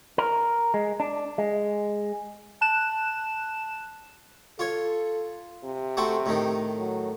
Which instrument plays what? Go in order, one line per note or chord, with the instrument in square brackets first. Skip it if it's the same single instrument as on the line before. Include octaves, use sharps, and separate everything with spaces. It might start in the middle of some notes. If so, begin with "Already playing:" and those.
[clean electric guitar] A#4
G#3
D4
G#3
[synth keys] A5 F#6 E7
[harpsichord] F4 C#5 [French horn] A4
[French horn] C3
[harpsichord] A3 C4 F#4
A2 D#3
[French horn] F#3